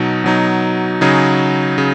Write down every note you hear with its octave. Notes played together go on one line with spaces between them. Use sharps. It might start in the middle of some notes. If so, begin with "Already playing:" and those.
Already playing: B2 F#3 D#4
B2 F#3 D#4
C#3 F#3 D#4 G#4
C#3